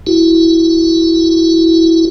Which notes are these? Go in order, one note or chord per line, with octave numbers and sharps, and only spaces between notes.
E4 F#4